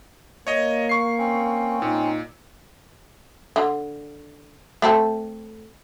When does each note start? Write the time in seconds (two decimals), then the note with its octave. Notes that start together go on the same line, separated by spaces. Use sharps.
0.47 A#3 C#5 D#5
0.89 C#6 C7
1.18 C4 C#4
1.82 A#2 D#4
3.56 D3
4.82 A3 C4 A4